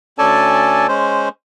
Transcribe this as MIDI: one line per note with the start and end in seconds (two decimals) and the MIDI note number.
0.18 0.87 38
0.18 0.87 61
0.18 0.87 69
0.18 0.87 74
0.18 0.87 80
0.18 0.87 81
0.88 1.29 56
0.88 1.29 61
0.88 1.29 72